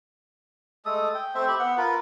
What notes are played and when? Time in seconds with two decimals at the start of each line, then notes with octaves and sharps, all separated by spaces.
0.85 G#3 A3 A4 D#6
1.15 G5
1.35 A3 C4 C5 E5
1.48 G4 E5 B5
1.59 B3 F#5
1.78 F4 A#4 B4